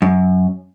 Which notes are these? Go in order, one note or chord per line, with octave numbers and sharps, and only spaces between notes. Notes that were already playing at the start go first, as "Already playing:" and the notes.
F#2